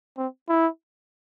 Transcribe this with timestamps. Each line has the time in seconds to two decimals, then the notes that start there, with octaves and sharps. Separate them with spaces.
0.17 C4
0.49 E4